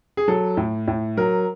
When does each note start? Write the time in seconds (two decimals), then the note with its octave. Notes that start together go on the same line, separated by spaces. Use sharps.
0.17 G#4
0.28 F#3 A4
0.57 A2
0.88 A2
1.17 F#3 A#4